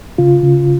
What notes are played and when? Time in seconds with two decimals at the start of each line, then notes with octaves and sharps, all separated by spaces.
0.18 C#3 F4
0.43 C#3